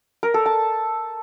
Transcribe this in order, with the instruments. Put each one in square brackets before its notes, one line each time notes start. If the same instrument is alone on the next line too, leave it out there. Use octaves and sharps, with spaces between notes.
[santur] A#4
A4
A5